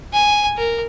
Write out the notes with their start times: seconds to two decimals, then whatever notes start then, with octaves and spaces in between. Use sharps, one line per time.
0.13 G#5
0.57 A#4